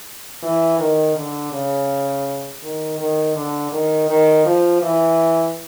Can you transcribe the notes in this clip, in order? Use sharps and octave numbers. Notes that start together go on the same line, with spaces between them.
E3
D#3
D3
C#3
D#3
D#3
D3
D#3
D#3
F3
E3